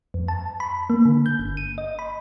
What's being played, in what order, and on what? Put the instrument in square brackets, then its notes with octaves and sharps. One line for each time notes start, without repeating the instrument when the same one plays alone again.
[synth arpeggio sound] F2
A5
B5
A#3
D3
G6
G1
D#7
D#5
B5